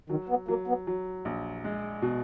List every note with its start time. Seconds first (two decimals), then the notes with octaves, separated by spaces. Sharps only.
0.10 D#3 F#3
0.29 B3
0.48 F#3 A#3
0.68 B3
0.87 F#3
1.25 A#1
1.64 G#3
2.02 B2